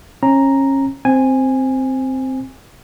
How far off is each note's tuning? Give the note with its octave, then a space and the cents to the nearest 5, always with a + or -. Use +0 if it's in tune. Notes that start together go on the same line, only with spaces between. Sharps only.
C#4 -30 A#5 +0
C4 +0 G#5 -10